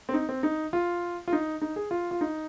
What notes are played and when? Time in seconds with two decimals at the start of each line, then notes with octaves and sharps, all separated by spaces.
0.09 C4
0.14 D#4
0.29 C4
0.43 D#4
0.73 F4
1.28 F4
1.33 D#4
1.62 D#4
1.76 G#4
1.91 F4
2.11 F4
2.21 D#4